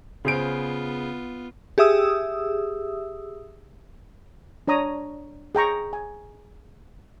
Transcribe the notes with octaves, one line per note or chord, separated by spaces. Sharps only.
C#3 B3 F4 C5 D7
G4 G#4 E5 D#6 E6
D4 C#5 A#5 D#6
G#4 G5 A#5 C#6
G#5